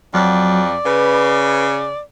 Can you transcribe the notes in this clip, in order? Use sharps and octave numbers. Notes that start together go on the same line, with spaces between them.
F2 F#3 D5
C#3 B4